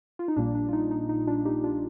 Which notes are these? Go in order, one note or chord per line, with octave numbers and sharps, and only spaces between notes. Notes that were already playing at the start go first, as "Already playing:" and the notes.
F4
D#4
A#1 A#2 G3 A#3 D4
D4
F4
D#4
D#4
D#4
D4 F4
D#4 G4
D4 F4